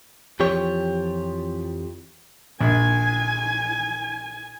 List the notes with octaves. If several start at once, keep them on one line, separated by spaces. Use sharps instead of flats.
F2 E3 F3 G4 C#5
A#1 G#5